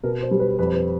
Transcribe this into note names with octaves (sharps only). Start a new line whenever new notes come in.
B2 A#4
C5
G3
B4
F2 B4
C5
B4